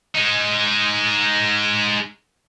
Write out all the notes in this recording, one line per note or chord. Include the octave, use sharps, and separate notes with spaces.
G#3 D#4